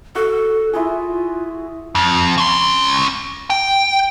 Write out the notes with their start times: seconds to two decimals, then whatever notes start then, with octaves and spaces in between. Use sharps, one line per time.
0.15 F#4 A4
0.73 E4 F4 G#4
1.95 F2
2.38 C#4 C6
3.50 G5